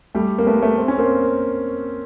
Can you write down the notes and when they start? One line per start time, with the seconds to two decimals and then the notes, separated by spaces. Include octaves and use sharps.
0.15 G3 A3
0.38 A#3
0.46 A3 B3
0.62 A3 B3
0.78 C4
0.88 C#4
0.98 A#3 C4